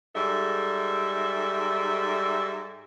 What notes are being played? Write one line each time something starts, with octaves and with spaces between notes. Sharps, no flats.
G#2 G3 A4 E5